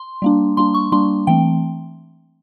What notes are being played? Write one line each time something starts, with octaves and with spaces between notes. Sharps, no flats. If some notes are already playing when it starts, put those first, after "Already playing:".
Already playing: C6
G3 A#3 D4
G3 A#3 D4 C6
C#6
G3 A#3 D4 C6
E3 A3 C4 G5